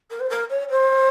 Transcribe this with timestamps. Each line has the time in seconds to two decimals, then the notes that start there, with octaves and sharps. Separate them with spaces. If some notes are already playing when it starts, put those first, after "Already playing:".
0.10 A#4
0.20 C5
0.29 A#4
0.50 C#5
0.70 C5